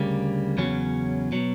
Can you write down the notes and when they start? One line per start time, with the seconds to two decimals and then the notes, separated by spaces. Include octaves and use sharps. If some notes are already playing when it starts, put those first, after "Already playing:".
Already playing: D2 C#3 G3 A#3
0.58 E2 C#3 F#3 C#4
1.32 B2 F#3